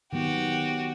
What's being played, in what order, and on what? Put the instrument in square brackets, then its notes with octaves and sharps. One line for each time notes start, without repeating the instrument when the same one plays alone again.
[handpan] D#3 F#3 B3 [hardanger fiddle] F#4 G4